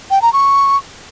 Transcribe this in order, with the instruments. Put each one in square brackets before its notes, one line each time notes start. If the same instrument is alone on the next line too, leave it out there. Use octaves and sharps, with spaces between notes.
[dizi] G5
A#5
C#6